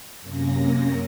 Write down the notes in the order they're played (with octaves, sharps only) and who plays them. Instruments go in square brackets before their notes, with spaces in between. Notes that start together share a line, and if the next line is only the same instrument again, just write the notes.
[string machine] F#2 C3 A#3 C#4 A#6